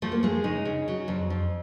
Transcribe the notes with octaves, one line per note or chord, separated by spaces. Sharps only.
F3 A3
A#3
G#3 A3
C#3 D#4
C#3
F#3
F2
F2